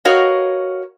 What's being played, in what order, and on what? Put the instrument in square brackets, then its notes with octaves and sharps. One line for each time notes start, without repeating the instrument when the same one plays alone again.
[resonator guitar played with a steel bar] F#4 A#4 B4 C#5 D#5 F5